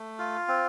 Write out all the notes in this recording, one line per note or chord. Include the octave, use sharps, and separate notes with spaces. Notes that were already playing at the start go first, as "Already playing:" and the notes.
Already playing: A3
F4
C4